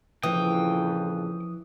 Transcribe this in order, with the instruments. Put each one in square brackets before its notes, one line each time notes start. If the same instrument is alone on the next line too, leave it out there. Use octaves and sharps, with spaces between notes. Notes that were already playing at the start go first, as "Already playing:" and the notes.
[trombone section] F2 A#2 C#3 [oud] E3 [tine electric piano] F3 D#6 [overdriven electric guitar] G5